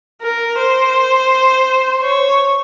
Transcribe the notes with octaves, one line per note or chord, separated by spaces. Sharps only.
A#4
C5
C#5